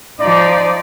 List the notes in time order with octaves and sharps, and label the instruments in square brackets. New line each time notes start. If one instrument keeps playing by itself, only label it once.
[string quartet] F3 D#4 [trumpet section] D5